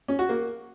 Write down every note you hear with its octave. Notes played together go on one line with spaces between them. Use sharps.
C#4
F#4
A#3